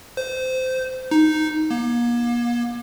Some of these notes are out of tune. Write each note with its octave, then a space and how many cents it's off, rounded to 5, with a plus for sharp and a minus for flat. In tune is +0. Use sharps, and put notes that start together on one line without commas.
C5 -20
D#4 +0
A#3 +40